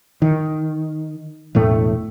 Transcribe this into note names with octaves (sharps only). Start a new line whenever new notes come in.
D#3
E1 A2 A3